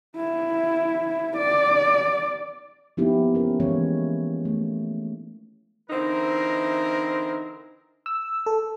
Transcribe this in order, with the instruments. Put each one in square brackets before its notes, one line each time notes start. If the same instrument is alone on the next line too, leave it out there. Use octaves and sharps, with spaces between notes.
[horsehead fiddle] E4
D5
[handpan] F3 A#3 B3 D#4 E4 G4
C#4 A#4
E3 G#3 A#3 C#4 C#5
A3
[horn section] D3 E3 C4 D#4 E4 A#4
[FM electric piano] E6
A4